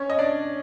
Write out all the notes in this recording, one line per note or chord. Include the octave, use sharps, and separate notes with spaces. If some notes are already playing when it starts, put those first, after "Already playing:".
Already playing: C#4 C#5
D#5
D4 D5